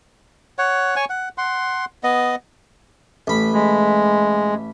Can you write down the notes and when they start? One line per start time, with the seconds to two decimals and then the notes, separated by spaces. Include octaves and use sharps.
0.58 C#5 F#5
0.96 C#5 G#5 C#6
1.10 F#5
1.38 F#5 C6
2.03 B3 D#5
3.27 A1 B5
3.54 G#3